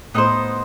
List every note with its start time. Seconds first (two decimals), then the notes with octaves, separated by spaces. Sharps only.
0.14 A2 B3 D#4 A4 C5